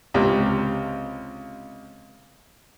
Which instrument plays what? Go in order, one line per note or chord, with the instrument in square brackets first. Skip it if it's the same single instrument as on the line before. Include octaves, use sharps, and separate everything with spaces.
[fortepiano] C#2 C3